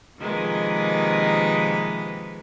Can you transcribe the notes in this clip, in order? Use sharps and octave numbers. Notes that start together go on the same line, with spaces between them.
C3 D#3 F3 G#3 A#3 B4